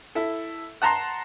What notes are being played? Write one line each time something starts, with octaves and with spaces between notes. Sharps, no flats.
E4 A4
F#5 A5 A#5 C6